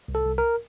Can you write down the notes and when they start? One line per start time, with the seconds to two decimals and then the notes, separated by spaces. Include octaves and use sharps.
0.08 C2
0.15 A4
0.26 C2
0.38 A#4